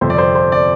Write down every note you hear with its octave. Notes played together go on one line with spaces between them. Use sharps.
G1 F2 C3 C5
D5
C5
C5
D5